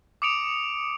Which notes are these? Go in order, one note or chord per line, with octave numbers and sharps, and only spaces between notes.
D6 D#6 C#7 D7 F7